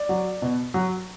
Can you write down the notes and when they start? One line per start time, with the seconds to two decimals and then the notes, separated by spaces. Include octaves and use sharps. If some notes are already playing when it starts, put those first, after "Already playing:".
Already playing: D5
0.09 F#3
0.42 B2
0.74 F#3